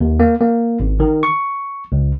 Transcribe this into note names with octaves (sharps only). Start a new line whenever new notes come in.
D#2
A#3
A#3
G#1
D#3
C#6
C#2